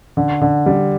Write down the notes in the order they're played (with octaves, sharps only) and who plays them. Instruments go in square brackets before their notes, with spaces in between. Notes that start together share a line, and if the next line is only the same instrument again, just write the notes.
[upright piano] D3
D3
G3